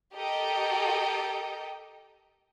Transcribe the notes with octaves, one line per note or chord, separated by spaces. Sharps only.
G4 A4 A#4 D#5 G5